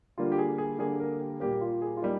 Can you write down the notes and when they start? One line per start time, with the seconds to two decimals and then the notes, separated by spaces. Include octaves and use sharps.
0.18 D3 G3 A#3 F4
0.32 G4
0.38 G#4
0.58 G#4
0.79 D3 G3 A#3 G#4
1.00 A#4
1.20 G4
1.40 A#2 G3 A#3 G4
1.61 F4
1.82 G#4
1.97 F4
2.02 G3 A#3 D#4